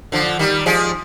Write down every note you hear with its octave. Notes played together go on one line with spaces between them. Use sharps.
D3 F3
D#3 G3
F3 G#3